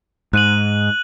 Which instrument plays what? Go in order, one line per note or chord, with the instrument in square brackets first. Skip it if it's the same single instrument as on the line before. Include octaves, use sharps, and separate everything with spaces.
[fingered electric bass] G#2 [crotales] F#6 D#7 F#7